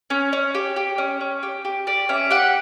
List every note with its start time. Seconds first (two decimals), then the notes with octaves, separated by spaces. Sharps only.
0.10 C#4
0.33 C#4
0.55 G4
0.76 G4
0.98 C#4
1.21 C#4
1.43 G4
1.65 G4
1.87 G4 D5
2.09 C#4 E5
2.31 G4 F#5